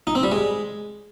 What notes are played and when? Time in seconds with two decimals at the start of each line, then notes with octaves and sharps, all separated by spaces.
0.07 D#4
0.15 C4
0.23 G3
0.32 G#3